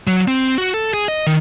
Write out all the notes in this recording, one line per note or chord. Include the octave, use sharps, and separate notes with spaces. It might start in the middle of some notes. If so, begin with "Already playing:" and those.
F#3
C4
F#4
A4
G#4
D#5
D#3